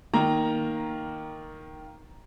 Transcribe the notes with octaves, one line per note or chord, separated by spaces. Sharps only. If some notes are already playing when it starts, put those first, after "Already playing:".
D#3 A#3 A#5